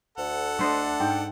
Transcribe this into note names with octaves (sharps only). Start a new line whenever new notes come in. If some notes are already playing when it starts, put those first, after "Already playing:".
D2 A4 F#5
A3 D4 C5 D#5
G#2 G5